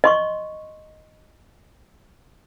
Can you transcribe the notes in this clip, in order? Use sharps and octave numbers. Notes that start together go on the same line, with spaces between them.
D#5 C6 C#6